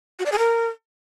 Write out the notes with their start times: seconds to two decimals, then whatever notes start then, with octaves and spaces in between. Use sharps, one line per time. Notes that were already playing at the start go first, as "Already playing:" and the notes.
0.19 F#4
0.26 D5
0.32 G#4
0.38 A#4